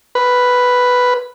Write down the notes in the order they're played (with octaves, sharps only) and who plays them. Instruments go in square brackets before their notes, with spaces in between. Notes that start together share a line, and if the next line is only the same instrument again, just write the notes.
[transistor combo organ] B4